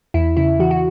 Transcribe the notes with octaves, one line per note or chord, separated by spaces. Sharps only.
E2 E4
C#3 E4
E3 F#4
F#4